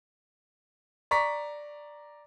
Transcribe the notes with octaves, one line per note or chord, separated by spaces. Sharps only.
D5 A#5 C#6 B6